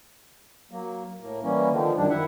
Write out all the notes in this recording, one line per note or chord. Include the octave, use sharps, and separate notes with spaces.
F#3 A#3
A2 A#3
E3 G3 A#3 C#4
D3 D#3 F3
F#2 D#3 F3 G3 D4
D#3 E4 E5 F#5